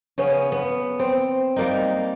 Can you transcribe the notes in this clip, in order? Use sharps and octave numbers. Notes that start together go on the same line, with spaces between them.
C#3 B3 C#4
B3
C4
G3 A#3 D#4